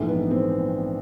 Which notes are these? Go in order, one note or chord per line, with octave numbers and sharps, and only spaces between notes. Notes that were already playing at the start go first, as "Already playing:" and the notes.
Already playing: A#1 G#2 E3 A3
B3
C4